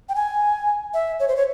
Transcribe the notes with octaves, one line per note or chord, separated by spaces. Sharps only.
G5
G#5
E5
C#5
C5
C#5